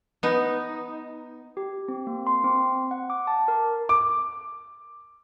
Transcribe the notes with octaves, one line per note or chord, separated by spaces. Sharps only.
B3 D#4
G4
C4
A#3
C6
C4
F#5
D6
A5
A#4
D6